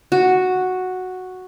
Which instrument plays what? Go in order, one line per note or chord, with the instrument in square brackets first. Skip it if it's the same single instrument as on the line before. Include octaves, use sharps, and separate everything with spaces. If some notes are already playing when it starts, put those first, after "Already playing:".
[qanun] F#4